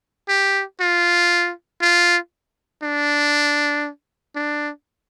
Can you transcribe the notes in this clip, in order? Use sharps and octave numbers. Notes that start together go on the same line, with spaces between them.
G4
F4
F4
D4
D4